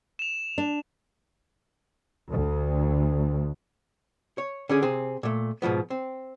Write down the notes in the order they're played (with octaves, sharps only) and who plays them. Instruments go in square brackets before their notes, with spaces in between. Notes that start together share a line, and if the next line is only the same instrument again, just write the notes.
[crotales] E7 F7
[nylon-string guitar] D4
[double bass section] D2
[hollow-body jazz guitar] C#5
D3 C#4 G#4
C3 C4 G#4
A#2 A3
G#2 B2 F3 B3
C4